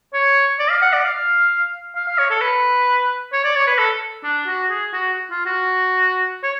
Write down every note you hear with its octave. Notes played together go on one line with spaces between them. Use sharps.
C#5
D5
F5
F#5
D5
F5
F5
F5
C#5
A4
B4
C#5
D5
C#5
B4
A4
D4
F#4
G#4
F#4
F4
F#4
C#5